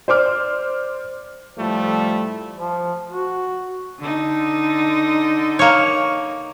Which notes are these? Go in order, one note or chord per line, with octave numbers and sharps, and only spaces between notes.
C5 D5 D6 F6
A2 F3 G3 A3
F3
F#4
D3 D#4
A#3 C#5